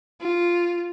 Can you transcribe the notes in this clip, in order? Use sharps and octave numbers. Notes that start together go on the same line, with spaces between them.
F4